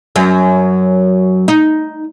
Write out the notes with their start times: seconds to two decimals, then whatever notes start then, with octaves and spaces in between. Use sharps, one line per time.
0.16 F#2 F#3
1.48 D#4